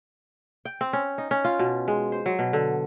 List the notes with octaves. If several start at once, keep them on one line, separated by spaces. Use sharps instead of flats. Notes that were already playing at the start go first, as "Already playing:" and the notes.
G5
C4
C#4
D#4
C#4
F4
B2
G#3
C5
F#3
B2
D3